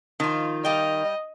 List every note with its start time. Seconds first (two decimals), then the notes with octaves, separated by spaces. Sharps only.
0.20 D#3 F3 F4
0.65 G3 D#5 F5 G5